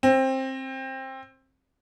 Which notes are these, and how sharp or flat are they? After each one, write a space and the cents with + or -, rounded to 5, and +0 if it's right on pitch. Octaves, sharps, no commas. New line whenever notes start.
C4 +20